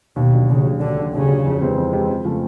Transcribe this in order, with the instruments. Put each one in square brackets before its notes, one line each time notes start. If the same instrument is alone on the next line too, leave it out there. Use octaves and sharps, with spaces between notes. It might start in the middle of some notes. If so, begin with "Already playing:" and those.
[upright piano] D#2 [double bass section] B2
[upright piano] D3 F#3
[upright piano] D#2 [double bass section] C#3
[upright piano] D3 F#3
[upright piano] D#2 [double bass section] D3
[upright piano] D3 F#3
[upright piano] D#2 [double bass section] C#3
[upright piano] D3 F#3
F2
C3 E3 G#3 C4
F2
C3 E3 G#3 C4
F2
C#3 F3 A3